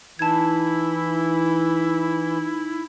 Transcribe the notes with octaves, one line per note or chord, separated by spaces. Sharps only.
E3 D#4 E4 A5 G#6